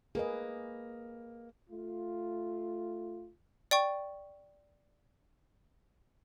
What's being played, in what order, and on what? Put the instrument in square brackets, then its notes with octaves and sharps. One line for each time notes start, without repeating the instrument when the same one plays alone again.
[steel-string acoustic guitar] A#3 [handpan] G#4 B4 D#5
[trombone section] A3 F4
[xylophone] D5 G5 C#6